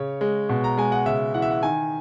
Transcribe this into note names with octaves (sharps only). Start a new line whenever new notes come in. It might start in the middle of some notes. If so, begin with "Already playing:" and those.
Already playing: C#3 C#5
G#3
B2
A#5
G#3 G#5
F#5
C#3 E5
E3 F#5
E5
F#5
D#3 G#5